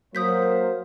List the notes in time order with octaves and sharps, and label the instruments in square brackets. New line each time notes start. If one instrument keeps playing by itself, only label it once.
[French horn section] F#3 [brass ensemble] A#3 C5 [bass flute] A#4 [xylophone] D#6 G6 B6